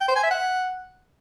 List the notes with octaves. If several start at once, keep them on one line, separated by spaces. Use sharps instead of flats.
G5
C5
G#5
E5
F#5